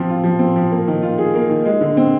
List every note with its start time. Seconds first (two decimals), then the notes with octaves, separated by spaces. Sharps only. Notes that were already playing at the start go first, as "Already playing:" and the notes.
Already playing: F3 C4
0.09 F4
0.24 F3
0.39 C4
0.56 F3
0.71 A#3
0.88 D#3
1.02 F4
1.18 G#4
1.35 A#3
1.49 D#3
1.65 G#3
1.81 D3
1.97 C4